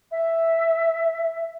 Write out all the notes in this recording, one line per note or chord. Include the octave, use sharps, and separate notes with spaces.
E5